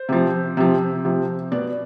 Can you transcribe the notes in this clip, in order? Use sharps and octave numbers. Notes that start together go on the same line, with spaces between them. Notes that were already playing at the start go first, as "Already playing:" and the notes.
Already playing: C5
C3 F3
C3 F3
C3 F3
B2 D5